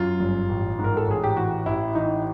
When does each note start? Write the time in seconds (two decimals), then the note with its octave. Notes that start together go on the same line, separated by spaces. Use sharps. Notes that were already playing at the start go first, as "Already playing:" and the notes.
Already playing: F#2 F4
0.20 G1
0.49 A1
0.79 G#2
0.84 A#4
0.97 A4
1.08 A1 G#4
1.24 G4
1.37 E3 F#4
1.66 A1 E4
1.95 E3 D#4